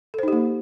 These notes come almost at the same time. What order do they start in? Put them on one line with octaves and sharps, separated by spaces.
A4 C5 D#4 G4 A#3